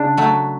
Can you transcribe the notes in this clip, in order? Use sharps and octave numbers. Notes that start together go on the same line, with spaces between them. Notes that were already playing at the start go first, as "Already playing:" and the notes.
Already playing: C#3 D4
F#3 A3